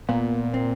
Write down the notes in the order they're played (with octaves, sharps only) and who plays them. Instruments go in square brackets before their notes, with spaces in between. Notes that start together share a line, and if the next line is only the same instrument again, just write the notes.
[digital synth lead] A#2 [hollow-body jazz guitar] B3
[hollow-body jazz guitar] C4